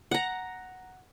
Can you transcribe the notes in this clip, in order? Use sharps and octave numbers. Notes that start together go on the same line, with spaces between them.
F#5 A#5